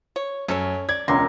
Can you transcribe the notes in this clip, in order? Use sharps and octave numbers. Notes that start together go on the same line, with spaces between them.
C#5
F#2 C#4 A4 C#5
D5 G#6
E1 C#2 A#3 C#4 A#5 C6 D6 A#6